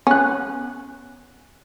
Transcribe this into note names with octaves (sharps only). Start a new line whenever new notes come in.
B3 C#4 F#6